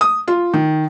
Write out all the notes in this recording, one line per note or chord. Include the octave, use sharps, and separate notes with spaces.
D#6
F4
D#3